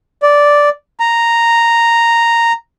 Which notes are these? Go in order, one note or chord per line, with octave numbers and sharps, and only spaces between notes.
D5
A#5